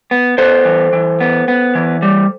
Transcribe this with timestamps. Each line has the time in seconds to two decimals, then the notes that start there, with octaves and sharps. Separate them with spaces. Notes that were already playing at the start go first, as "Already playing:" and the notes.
0.11 B3
0.38 B3 A4 C5
0.65 E3
0.93 E3
1.20 B3
1.48 B3
1.75 E3
2.02 G3